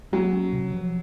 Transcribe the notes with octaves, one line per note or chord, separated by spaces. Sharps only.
F#3 A#3
C#4
C3
F3